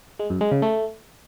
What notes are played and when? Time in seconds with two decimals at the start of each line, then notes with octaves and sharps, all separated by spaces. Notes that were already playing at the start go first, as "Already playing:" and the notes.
0.19 G#3
0.30 F#2
0.41 G#3
0.52 C#3
0.62 A3